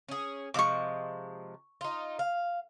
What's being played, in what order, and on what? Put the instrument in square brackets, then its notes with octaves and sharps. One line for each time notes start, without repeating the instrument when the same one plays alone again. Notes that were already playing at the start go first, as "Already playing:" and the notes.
[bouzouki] C#4 G#4
[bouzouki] C3 F3 G#3 [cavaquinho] C#6 D6
[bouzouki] D#4 F4
F5